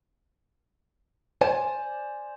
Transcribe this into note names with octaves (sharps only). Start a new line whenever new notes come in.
C5 D5 G#5